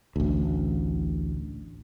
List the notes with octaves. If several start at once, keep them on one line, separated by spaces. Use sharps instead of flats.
A1 D2